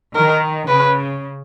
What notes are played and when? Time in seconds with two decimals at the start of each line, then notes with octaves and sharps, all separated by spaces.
0.15 D#3 A#4
0.68 C#3 B4